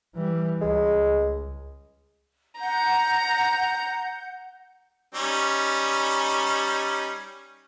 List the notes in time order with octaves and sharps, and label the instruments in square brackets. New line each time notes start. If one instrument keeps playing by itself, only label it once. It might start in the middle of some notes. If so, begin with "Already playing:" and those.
[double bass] E3 G3
[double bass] C#2 [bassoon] G#3
[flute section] F#5 G6 [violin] A#5
[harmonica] G3 C#4 D#4